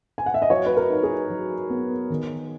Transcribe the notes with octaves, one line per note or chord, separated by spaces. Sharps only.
G#5
F#5
E5
D#5
F#3 C#5
B4
A#4
D#4
G#4
F#3
B3
D#3